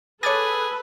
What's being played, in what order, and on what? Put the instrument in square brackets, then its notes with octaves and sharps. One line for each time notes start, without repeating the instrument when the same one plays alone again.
[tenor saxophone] G#4 [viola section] A4 B4 [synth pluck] C#5 D6 A6 [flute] B5